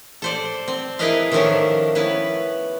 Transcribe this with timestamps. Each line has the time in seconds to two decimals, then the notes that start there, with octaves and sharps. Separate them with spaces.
0.22 A4 C5 D5
0.68 C4
0.99 E4 G#4 A#4 B4 D#5 F5
1.32 D#3 F3 A3 C#4 G4 A#4
1.95 B3 C#4 E4 B4